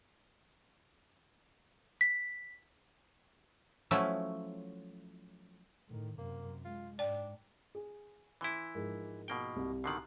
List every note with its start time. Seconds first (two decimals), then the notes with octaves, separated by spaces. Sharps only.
2.01 B6
3.91 F3 F#3 A3 C#4 E4
5.89 A2 D#3
6.18 F#2 C3 A#3
6.65 G#3 F4
6.99 G#2 D4 D5 G5
7.75 G#4
8.41 E3 E4 C6 G7
8.75 G#2 F3 A#4
9.28 B2 A#3 G5
9.56 C2
9.84 B2 D3 D#3 C7 F#7